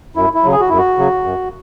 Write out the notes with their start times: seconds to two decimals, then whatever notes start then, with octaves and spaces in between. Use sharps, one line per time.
0.16 F#2 E4
0.34 E4
0.44 C#3 F#3
0.52 G#4
0.61 F#4
0.69 F#2 E4
0.78 F#4
0.98 C#3 F#3
1.24 F#2